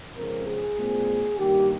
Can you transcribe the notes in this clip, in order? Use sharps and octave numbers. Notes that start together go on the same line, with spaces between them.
F2 C#3 G#3 C4 A#4
G#4
A#2 G#3 C4
G2 D#3 A#3 G4